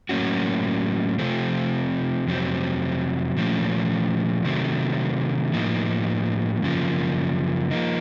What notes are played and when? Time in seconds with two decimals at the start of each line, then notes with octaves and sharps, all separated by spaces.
0.09 A2 F#3 A#3 C#4 F#4
1.19 C3 F3 A3 C4
2.27 F2 C3 F#3 C4
3.36 A#2 F3 A3 C#4
4.44 C3 D#3 F#3 A3 C4
5.54 A2 F3 A#3 D#4
6.62 F#2 C#3 F3 A#3
7.71 F3 A#3 D#4